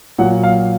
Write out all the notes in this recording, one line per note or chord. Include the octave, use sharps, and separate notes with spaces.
A#2 F#3 F#5
F5